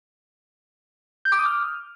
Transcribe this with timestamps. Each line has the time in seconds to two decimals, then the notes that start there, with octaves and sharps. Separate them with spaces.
1.25 G6
1.32 D6
1.39 D#6
1.45 F6